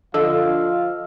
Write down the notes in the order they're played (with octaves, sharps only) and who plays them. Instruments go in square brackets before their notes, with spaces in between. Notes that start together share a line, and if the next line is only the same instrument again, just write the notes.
[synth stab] D3 [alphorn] F3 [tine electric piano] D#5 E6 [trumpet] F5